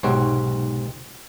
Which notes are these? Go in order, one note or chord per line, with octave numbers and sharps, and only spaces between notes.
B1 G#2 C3 C4 F#4 C#5